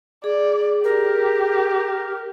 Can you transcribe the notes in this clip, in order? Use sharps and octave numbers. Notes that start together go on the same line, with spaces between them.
G#4 D5
G4 A#4